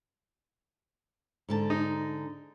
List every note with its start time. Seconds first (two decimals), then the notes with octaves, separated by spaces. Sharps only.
1.49 G#2 D3 A5
1.70 D#4